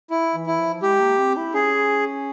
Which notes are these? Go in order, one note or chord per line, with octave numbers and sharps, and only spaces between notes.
E4
E3
E4
F3
G#3 G4
A#3
C4
E4
C#4 G#4